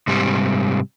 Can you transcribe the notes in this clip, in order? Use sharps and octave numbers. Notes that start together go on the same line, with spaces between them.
G#2 C3 G3